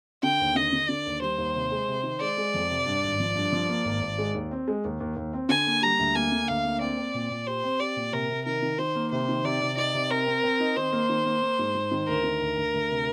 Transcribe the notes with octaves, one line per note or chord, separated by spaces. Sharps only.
D3 G5
D#2
D3 D#5
D3
D3 D5
D#2
G3 C5
D#2
C3
G#3
C3
D#3
G#3 D5
G#3
F2
C3
G2
G#1
F3
G2
F3
A#3
G#1
G#1
G#3
D#2
C4
G#3
D#2
D#2
D#2
C4
D3 G#5
A#3
G3 A#5
D2
A#3 G#5
D3
D2 F5
A#3
C4 D5
C4
A#2
A#2
G4 C5
C4
G4 D5
A#2
C3 A#4
C3
D#3 A#4
D#3
D#3 C5
A#3
C3 C5
D#3
C3 D5
C3
D#4 D5
C3
C4 A#4
C4
C4
D#4
D#3 C5
A#3
D#3
A#3
A#3
G#2
G#2
D#3
D2 A#4
D#3
D2
D2
D2
C3